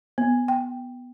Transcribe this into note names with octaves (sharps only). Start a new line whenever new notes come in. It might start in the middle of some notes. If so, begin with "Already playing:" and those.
B3
G5